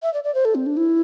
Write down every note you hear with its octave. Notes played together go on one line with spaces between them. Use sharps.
E5
D5
D5
C5
A4
C4
D4
E4